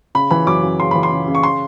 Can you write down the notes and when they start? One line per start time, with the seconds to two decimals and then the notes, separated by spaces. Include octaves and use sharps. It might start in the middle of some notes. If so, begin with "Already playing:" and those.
0.15 C#3 B5
0.31 E3 B5
0.47 F#2 D6
0.63 F#2
0.80 C#3 C6
0.91 E3 B5
1.03 C6
1.11 C#3
1.28 C#3
1.35 C#6
1.43 C6